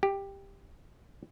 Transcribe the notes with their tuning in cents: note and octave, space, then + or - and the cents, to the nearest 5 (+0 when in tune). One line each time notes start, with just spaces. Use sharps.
G4 +10